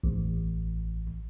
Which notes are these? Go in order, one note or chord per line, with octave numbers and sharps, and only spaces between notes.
A1